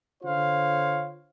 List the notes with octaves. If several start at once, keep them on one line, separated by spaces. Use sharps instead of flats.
D3 F4 C5 C#5 F5